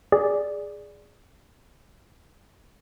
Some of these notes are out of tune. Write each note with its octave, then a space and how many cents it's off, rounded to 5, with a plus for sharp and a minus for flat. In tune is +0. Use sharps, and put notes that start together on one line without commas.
G#4 +0 D5 +0